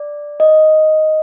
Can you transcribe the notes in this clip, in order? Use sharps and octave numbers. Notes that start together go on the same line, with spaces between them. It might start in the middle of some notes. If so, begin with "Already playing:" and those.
Already playing: D5
D#5